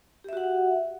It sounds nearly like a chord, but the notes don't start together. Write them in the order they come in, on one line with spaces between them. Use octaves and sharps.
G4 E5 F#4 F#5